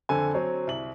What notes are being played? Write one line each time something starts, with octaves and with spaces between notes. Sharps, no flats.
F2 D3 A4 C5 G#5
F#3 C4 C5 C#5
C2 F#7